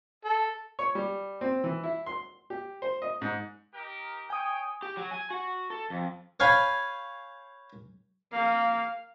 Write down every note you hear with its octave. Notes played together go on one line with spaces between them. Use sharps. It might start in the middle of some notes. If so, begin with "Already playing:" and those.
A4
C#5
G3
C4
E3
E4
C6
G4
C5
D#5
G#2
D#4 G4 A#4
C#5 G5 G#5 D#6
G4
F#3
G#5
F#4
A4
F2
C#5 F5 G5 G#5 B5
A#3 F5